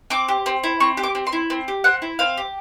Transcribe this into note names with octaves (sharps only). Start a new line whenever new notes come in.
C4 D6
G4
C4
E4
C4 C#6
G4
D6
C4
C6
E4
C4
G4
C4 F#5
E4
C4 F5
G4